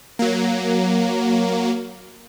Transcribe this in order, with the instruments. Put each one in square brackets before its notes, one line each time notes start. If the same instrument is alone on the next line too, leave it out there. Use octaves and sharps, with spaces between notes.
[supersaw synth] F#3 A#3